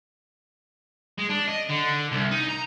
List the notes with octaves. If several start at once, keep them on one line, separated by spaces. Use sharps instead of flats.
G#3
D4
D#5
D3
C2
D#4
A#5